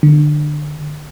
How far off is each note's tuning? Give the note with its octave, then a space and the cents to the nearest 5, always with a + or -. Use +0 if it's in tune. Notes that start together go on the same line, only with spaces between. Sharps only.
D3 +25